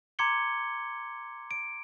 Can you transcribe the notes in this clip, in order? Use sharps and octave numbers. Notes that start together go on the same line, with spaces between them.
A#5 C6 D6 G#6 C#7 G7
D7